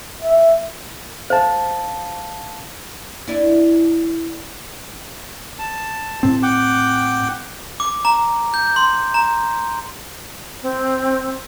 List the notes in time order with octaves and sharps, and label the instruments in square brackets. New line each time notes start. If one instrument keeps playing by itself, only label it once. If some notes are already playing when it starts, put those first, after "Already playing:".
[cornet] E5
[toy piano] C5 [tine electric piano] F5 A5
[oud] D4 E4
[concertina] A5
[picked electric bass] A2 C4
[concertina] F#5 G5 D6
[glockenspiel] D6
A#5
G6
C6
A#5
[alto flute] C4